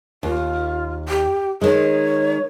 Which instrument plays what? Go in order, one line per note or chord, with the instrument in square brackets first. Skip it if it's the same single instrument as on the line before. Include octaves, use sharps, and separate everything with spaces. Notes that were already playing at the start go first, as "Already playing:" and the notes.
[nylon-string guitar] D#2 [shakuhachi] F4
[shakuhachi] G4
[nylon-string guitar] D#3 G#3 [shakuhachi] C#5